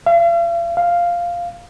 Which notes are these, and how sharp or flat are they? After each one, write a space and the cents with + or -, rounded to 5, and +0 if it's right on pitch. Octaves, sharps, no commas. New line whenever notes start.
F5 -45
F5 -5